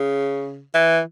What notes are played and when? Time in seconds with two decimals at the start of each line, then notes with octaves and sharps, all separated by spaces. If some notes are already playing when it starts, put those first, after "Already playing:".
Already playing: C#3
0.75 E3